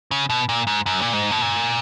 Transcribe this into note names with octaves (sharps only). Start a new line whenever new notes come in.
C#3
B2
A#2
G#2
F#2
A#2
G#2
B2
A#2